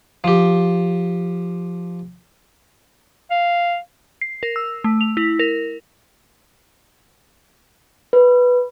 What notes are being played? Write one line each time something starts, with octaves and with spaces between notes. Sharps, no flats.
F3 G4
F5
C7
A#4
E6
A3
F7
E4
A#4
B4